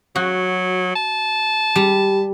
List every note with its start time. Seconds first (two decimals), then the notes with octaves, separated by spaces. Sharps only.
0.16 F#3 F#4
0.95 A5
1.76 G3